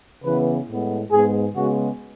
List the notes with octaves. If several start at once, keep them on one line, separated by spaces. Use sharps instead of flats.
C#3 E3 B3 B4
A2 G#3 B3
G#2 G#3 B3 G#4
C#3 G#3 B3 F#4